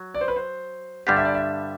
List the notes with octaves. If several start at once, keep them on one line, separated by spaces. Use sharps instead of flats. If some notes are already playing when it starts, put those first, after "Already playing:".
Already playing: F#3
D5
C5
B4
C5
G2 D3 G3 D4 G4 F#5
E5
D5
E5